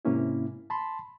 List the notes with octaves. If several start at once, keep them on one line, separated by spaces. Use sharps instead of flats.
G#2 C3 A#3 C#4 E4
A5 B5 C6